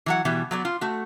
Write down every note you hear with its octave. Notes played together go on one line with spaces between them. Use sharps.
E3 F#3 F#5
B2 E3 G3
F#3 B3 D5
F4
A3 F#4